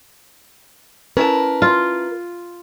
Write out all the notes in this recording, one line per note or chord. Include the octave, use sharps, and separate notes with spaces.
C#4 E4 A#4 B4 A5
F4